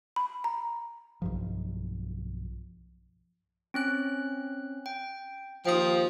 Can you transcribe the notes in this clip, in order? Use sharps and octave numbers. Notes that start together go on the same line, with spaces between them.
B5
A#5
B1 G2 F3
C4 C#4 F#6
G5
D#2 F3 G5 D#6